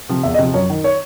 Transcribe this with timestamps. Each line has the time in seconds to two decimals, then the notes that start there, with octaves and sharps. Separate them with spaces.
0.09 C3 F3
0.23 E2 E5
0.34 D#5
0.39 C3 F3
0.54 F#2 C#5
0.70 D#3
0.84 C#5